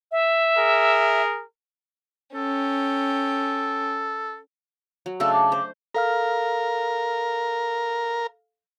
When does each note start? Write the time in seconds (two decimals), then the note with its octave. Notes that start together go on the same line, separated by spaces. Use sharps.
0.12 E5
0.58 G#4 A#4
2.35 C#4 A4 G5
5.06 F#3
5.20 C#3 A3 D4 A4 F5 A5 E6
5.33 D6
5.52 C5
5.94 A4 A#4 F5 F6